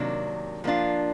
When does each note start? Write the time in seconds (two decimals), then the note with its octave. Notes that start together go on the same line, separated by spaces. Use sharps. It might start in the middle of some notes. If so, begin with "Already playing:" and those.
Already playing: C3 D#3 F#3 A#3 D4
0.64 F3 A#3 D4 F4